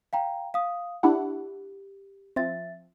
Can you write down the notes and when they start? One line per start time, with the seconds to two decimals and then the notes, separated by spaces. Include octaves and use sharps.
0.13 F5 G5 A#5
0.54 F5 D#6
1.03 D4 E4 G4 F#5
2.36 F3 C4 E5 A6